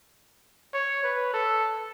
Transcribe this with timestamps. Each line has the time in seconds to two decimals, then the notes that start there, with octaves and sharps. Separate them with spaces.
0.73 C#5
1.04 B4
1.34 A4